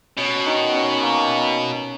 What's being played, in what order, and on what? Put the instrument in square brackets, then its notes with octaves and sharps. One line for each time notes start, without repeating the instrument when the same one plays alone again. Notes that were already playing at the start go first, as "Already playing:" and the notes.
[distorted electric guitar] B2 [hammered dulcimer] C#4
[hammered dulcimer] D#3
C#4
A#3